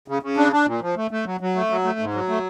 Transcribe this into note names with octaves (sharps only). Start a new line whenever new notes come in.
C#3
C#3
D4
D4
A#2
F3
A3
A3
F#3
F#3
A3
F#3
A3
G#2
F#3
A3